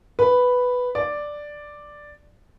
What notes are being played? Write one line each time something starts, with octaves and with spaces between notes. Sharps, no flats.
B4
D5